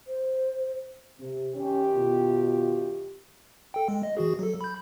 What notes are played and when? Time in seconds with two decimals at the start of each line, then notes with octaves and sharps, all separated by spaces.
0.08 C5
1.20 C3
1.54 F#2 D#3 C#4 G4
1.95 B2 F4
3.74 A4 G5
3.88 G#3
4.03 D#5
4.17 E3 F#4 G#4
4.39 F#3 A4
4.61 B5 G6